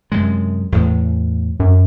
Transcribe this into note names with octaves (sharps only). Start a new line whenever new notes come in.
F#2 C3 G#3
E2 A2
F#2